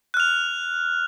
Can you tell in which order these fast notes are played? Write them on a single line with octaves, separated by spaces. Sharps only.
F#6 F6 F7